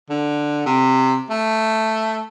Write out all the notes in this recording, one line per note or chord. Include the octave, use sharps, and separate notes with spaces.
D3
C3
A3